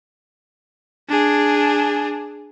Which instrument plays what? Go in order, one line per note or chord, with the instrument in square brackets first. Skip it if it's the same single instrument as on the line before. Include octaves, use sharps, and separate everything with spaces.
[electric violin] D4 G#4